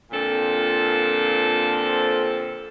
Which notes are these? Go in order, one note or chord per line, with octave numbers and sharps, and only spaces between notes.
A#2 D3 F3 C4 A4